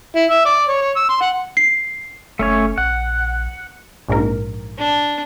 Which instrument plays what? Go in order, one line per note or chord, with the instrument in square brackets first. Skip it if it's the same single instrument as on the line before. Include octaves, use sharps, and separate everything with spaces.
[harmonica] E4
E5
D5
C#5
C#5
E6
C6
F#5
[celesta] C7
[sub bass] F#1 [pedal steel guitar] A3 C#4 C#5
[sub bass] A#1 [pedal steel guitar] F#5
[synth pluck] A#1 G#2 A#4
[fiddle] D4